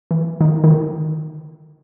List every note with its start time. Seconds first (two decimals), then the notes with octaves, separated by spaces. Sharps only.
0.11 E3
0.41 D#3
0.64 D#3
0.70 D3